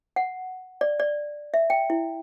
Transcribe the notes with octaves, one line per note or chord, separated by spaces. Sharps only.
F#5
D5
D5
E5
G5
E4